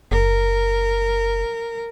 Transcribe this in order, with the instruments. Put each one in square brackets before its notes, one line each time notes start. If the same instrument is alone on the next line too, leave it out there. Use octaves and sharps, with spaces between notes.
[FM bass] F#1 [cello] A#4